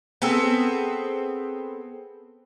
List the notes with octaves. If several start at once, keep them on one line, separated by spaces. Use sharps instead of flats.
B3 C4 G#4 A4